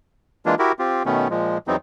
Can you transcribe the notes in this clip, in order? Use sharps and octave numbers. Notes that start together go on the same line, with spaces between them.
E3 G#3 A#3 D4 F4
E4 F#4 G4 A#4
C4 F4 G4
B2 D#3 A3 B3 C#4
A#2 F3 G#3
E2 E3 F#3 B3 C4 D#4